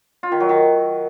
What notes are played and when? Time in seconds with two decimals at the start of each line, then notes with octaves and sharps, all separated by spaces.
0.23 F4
0.32 D#3
0.40 F#3
0.49 D#3